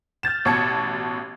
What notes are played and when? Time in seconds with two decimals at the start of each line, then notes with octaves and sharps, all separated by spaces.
0.23 F6 G6 A6 E7
0.45 A1 B2 A5 G#6 C#7